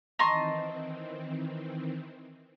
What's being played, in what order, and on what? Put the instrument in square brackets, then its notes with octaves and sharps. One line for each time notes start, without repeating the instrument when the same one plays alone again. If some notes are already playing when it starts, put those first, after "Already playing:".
[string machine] D#3 E3 C4 [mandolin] D#5 A5 C6 [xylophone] A#5 C#6